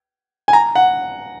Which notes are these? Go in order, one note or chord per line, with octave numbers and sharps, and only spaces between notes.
G#5
A#5
F#5